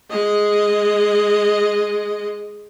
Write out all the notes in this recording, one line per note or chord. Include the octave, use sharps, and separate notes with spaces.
G#3 D#5